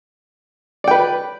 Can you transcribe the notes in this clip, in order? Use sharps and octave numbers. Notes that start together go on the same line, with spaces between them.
B4 D5 G5